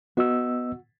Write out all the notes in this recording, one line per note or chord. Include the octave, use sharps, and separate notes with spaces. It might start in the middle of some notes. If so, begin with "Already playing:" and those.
B3 F#4 D#5 E6